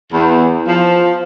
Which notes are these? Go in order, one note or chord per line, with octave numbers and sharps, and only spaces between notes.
E2
F3